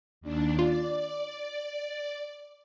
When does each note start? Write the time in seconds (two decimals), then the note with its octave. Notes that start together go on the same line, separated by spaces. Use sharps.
0.21 D#2 D4
0.59 F4 D5